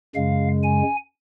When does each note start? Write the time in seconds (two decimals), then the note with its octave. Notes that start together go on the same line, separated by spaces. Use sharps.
0.15 F#2 C#3 G#3 F5
0.63 G#5